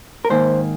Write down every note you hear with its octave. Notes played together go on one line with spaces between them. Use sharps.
A#4
G#2 D#3 A#3 C5